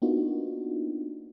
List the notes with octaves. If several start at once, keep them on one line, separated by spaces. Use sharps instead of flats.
A#3 B3 D4 D#4 F4 F#4